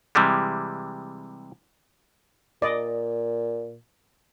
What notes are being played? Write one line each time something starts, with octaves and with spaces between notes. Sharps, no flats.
C3 E3 G3 G#3
A#2 D5 D#5